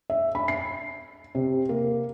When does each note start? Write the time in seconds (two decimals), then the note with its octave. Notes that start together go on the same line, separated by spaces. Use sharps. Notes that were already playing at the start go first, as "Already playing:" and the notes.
0.10 E5
0.35 B5
0.48 C7
1.35 C3
1.69 A#3